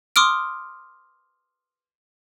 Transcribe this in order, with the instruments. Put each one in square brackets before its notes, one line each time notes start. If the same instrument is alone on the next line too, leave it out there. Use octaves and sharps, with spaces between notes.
[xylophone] C6 D6 D#6 F6 D7